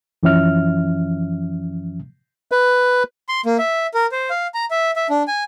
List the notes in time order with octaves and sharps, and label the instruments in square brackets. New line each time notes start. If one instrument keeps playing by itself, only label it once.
[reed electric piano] F#2 E3 F3 C#4 E5 F6
[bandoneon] B4
[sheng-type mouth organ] C6
A#3
E5
A#4
C5
F5
A#5
E5
E5
D4
G#5